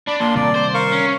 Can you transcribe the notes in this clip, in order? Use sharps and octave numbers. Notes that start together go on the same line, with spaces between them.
D4 D5 B5
A#2 D4 C6
C3 D#3 G3 D5
C5
A#4 F5 C#6
C#4